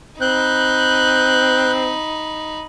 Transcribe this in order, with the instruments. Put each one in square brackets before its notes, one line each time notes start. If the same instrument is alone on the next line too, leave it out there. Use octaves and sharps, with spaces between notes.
[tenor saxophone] C4 [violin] D#4 B5 [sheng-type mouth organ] F#6 G6